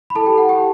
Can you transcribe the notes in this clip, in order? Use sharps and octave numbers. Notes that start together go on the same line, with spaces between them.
B5
E4 A4 A5
G4 G5
A4 F#5
G4 G5